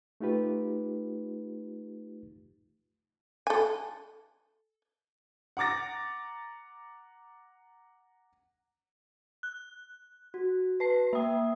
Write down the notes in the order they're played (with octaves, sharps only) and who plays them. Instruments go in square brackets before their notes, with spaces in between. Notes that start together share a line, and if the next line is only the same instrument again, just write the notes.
[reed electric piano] A3 D#4 F4 G4 B4
[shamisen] A4 G#5
[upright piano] F#5 A#5 D6 A6 A#6
[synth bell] F#6
[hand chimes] F#4
[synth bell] B4 A5 C7
[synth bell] A#3 G5 [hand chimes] E5 D#6